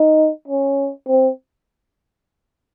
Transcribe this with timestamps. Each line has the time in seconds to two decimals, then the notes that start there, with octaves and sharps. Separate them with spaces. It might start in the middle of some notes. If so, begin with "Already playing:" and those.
Already playing: D#4
0.48 C#4
1.08 C4